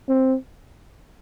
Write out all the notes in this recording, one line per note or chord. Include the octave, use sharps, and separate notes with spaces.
C4